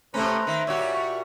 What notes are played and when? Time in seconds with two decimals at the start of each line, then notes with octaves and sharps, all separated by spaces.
0.14 C3 A3 C#4 B4 C5 A#5
0.47 D#3 E5
0.67 A#2 G3 F#4 C#5 D5 E6
0.94 C#6